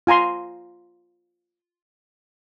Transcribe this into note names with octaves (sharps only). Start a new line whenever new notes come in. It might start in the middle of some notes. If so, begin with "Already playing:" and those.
F4 G#5 A#5 C6